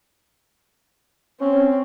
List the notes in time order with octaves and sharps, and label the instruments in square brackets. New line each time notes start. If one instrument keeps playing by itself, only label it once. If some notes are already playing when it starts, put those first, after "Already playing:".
[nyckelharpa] C4 [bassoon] C#4